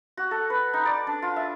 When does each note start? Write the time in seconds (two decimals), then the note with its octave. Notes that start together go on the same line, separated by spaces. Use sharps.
0.17 F#4
0.31 A4
0.50 B4
0.74 D#4
0.85 D5
1.07 D4
1.22 F4
1.36 E5